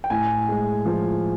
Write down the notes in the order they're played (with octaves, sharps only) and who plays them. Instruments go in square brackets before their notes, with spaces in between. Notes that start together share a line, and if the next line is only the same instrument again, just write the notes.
[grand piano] G5
A2 G#5
G#3
F3